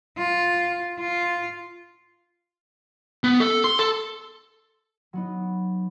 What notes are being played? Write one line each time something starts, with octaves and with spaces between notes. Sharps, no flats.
F4
F4
B3
A4
C6
A4
F#3 B3 D#4